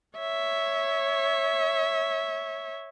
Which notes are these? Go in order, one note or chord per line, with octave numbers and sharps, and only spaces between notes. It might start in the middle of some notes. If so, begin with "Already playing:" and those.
C#5 E5